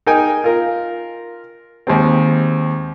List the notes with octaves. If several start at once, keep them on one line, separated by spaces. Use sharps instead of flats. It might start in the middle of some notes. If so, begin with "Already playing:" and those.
D#4 G#4 A#4 G5 G#5
F4 A#4
D#2 G#3 C4